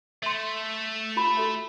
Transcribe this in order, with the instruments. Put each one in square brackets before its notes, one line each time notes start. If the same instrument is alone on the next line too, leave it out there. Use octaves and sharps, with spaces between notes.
[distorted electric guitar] A3 [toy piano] E5 C6
[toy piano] F4 G4 B5
F#4 A4 E5